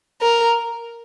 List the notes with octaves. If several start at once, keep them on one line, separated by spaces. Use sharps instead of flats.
A#4